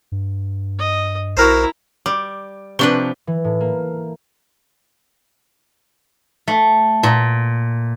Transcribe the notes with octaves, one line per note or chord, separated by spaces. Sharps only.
G2
D#5
B1 E4 F#4 A#4 C5 A#5
G3 D6
C3 F3 D4 B4 C#6 G7
E3
A2
A#3
A3
A#2